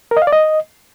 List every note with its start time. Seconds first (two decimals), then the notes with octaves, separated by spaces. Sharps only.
0.11 A#4
0.17 D#5
0.22 F5
0.27 D5
0.32 D#5